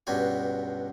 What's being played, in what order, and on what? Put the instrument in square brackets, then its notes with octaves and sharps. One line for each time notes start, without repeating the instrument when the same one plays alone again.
[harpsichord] C#2 G2 B2 D4 G4 G#5